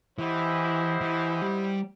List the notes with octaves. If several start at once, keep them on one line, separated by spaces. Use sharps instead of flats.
E3 E4 G4 C5 D#5 F#5
E3
G3